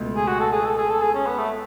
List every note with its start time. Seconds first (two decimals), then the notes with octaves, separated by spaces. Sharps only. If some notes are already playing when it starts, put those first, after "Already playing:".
Already playing: C#2 B2 A3
0.16 G#4
0.27 F#4
0.40 A4
0.52 G#4
0.65 A4
0.77 G#4
0.90 A4
1.01 G#4
1.15 C#4
1.26 B3
1.38 A3